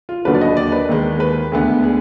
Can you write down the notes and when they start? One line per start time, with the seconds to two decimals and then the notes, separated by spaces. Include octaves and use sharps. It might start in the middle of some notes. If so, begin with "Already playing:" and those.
0.09 F4
0.25 D#2 D3 F#3 D4 B4
0.35 D5
0.41 D#5
0.57 D5
0.72 B4
0.89 D#2 D#3 G#3
1.20 B4
1.52 D2 D3 G#3 B3
1.84 G#4